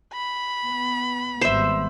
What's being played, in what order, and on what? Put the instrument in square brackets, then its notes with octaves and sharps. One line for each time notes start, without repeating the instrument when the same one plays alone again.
[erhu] B5
[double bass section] B3
[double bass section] G#1 G3 B3 [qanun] C5 E5